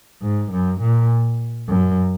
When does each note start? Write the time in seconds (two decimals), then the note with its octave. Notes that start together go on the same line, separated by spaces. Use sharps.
0.22 G#2
0.51 F#2
0.80 A#2
1.68 F#2